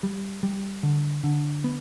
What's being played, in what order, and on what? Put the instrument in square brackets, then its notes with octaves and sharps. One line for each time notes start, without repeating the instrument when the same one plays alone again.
[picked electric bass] G3
G3
D3
D3
B3